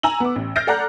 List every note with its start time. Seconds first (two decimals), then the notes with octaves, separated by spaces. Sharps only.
0.03 G#5 A#5 E6 F#7
0.20 B3 D6
0.36 A1
0.56 F6 G6 A6 A#6 C7 D7
0.67 A4 D5 F#5 A#5 F#6